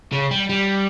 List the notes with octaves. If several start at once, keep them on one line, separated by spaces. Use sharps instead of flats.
C#3
G3
G3